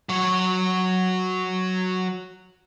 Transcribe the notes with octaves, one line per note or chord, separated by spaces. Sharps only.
F#3 C#5